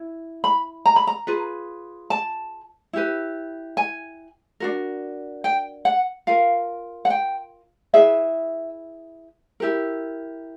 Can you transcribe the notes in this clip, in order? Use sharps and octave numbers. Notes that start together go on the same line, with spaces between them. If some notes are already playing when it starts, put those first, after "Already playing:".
Already playing: E4
B5
A#5
B5
A#5
F4 G#4 B4
A5
E4 G4 B4
G#5
D4 F#4 A#4
G5
F#5
F4 A#4 F5
F#5
G5
E4 G#4 B4 E5
E4 G4 A#4